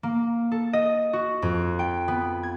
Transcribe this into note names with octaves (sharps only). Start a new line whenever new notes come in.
A#3
A4
D#5
F#4
F2
G5
B3
G#6